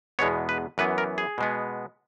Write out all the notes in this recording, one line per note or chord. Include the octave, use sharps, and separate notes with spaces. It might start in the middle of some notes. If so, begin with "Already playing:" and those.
E2 B2 G#3 B3 C#5
B4
F#2 E3 B3 B4
A#4
G#4
B2 G#3 B3